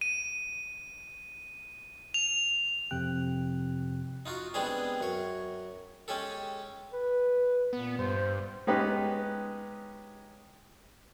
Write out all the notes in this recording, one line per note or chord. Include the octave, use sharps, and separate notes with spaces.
D#7
F7
F2 C3 G5 F#6
D#4 F4 F#4
G3 G#3 B3 C4 D4 G#4
F#2 C#5
G#3 C#4 G4 A4
B4
A#2 B3
G2 C5
G#3 B3 C#4 D#4 G4 B4